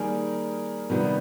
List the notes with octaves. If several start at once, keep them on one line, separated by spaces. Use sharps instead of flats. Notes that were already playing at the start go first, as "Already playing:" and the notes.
Already playing: D#3 G3 A#3 G#4 A#4
C3 D#3 G3 B3